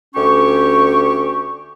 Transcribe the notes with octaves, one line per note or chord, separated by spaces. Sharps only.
D2 C#4 G4 C#6